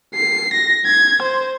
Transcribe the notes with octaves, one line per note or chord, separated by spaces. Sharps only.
C7
A#6
G#6
C5